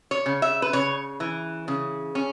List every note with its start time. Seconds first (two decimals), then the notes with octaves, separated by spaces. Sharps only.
0.11 C#5
0.26 C#3
0.42 E5
0.62 B4
0.73 C#3 C#5
1.20 E3
1.68 C#3
2.15 C#4